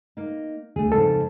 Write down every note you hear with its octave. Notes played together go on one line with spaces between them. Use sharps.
A#3 D#4
D2 A3 G#4
F2 G#2 C#3 A4